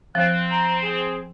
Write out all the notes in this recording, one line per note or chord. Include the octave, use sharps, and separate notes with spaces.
F3 C4 F#6
A#5
G#4